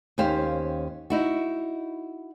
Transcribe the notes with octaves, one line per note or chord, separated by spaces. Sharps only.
D#2 C#4 G4 C5 F5
D#4 E4 F#4